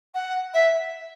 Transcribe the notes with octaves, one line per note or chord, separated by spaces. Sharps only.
F#5
E5